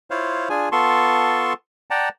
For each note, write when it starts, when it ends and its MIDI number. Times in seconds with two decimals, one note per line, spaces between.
0.10 0.49 64
0.10 0.49 65
0.10 0.49 72
0.10 0.49 73
0.10 0.49 77
0.49 0.69 62
0.49 0.69 65
0.49 0.69 68
0.49 0.69 80
0.72 1.53 59
0.72 1.53 65
0.72 1.53 69
0.72 1.53 81
0.72 1.53 84
0.72 1.53 85
1.90 2.09 74
1.90 2.09 78
1.90 2.09 79
1.90 2.09 81
1.90 2.09 82